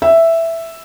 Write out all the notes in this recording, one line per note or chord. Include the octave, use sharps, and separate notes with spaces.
E5